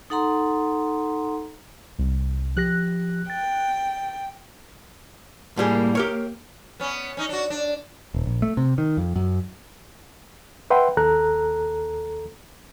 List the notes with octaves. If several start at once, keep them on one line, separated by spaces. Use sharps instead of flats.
D#4 A4 F#5 A#5 C6
C2
F3 G4 F#6 A#6
G5 A6
A2 G3 A#3 G#4
G4 A#4 C#5
B3 C#4
C#4 D#4
D4 F#4
D4
D#1
A#1
A3
C3
D#3
F2
F#2
B4 E5 F#5 G5 B5 C6
D#2 A4 A#5 F#6